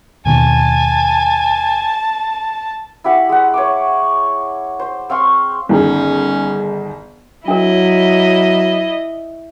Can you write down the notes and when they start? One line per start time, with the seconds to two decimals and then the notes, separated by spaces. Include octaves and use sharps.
0.26 D#2 B2 D#3 G#5 A5
3.04 E4 G4 F#5
3.29 G#3 F#5
3.54 C#5 D6
4.80 C5
5.10 C4 F5 C6 C#6
5.69 G1 D#3 C#4 G#4
7.48 F#3 D4 E4 A#4 D#5